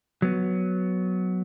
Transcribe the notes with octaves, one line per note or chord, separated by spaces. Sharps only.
F#3 B3